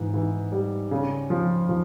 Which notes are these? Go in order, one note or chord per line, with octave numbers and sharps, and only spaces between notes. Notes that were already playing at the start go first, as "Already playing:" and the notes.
Already playing: G#2 E3
E3
G3
C#3
F3
F3